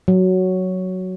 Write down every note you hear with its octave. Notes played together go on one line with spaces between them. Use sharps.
F#3